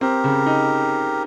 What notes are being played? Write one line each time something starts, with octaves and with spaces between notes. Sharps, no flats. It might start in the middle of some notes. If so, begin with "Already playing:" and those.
C4 G4 A#4
C#3
D#4